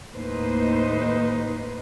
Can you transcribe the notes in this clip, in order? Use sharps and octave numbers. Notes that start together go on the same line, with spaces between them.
D#2 A2 D#4 B4 C5